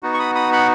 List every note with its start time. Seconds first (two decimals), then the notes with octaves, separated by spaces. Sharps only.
0.03 B3 D#4 F#4
0.14 C#6
0.19 B5 D#6
0.35 B5 D#6
0.52 F#5 B5